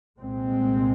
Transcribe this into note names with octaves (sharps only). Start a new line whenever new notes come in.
C2 A#2 G#3 C4